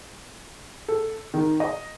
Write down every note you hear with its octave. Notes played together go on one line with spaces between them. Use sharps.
A4
D#3
D#5